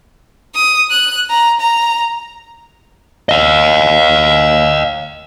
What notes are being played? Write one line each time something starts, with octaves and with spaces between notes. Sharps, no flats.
D#6
F#6
A#5
A#5
D#5 F5